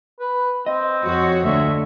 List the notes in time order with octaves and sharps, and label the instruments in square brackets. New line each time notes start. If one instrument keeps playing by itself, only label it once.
[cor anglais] B4
[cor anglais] C4 [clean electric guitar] D#5
[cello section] F2 F#4 C#5
[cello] D2 [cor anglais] E5